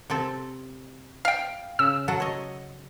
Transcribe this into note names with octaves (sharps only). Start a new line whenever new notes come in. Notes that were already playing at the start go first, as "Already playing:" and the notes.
C3 C4 A4
F5 G5
C#3 E6
F#3 A4 F#5
C#5 D#5